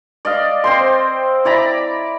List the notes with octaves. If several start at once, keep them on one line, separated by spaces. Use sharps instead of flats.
D5 D#5 F5
C4 C5 C6
E4 D5 A#5 B5